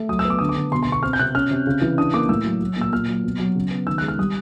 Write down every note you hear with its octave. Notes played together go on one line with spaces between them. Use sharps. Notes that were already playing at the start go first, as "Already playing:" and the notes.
Already playing: A3
F#3 D#6
E6
B3
D6
D3 D#6
D6
D3
B2 C6
C6
B2
C#6
C4 F6
G6
C3 F#6
C#4 F6
C3
C#3
E3
D4 D#6
A#3 D6
A2 E6
F#3
F#3
A#2 E6
A#2 F6
F#3
B2
F#3
C#3
B3
D#3 E6
F#6
G#3
F6
G3 D#6